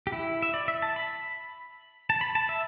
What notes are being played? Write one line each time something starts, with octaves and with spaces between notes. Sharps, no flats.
G4
E4
E5
D5
E5
A5
B5
A5
B5
A5
E5